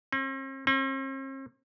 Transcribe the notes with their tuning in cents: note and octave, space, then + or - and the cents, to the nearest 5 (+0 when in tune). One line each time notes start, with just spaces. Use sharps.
C4 +45
C4 +45